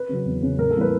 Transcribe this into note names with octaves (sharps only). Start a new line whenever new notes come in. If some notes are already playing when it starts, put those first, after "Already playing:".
Already playing: B4
C#3 F#3
E2
C#3 F#3
A2 A#4
A4
E3 G3 A#3 B4